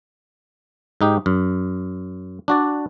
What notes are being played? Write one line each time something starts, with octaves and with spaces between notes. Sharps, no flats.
G#2 D#4 G4
F#2
D4 F#4 D5